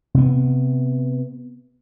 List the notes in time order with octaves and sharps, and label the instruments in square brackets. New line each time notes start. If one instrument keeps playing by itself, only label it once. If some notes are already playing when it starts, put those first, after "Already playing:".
[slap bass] C3 B3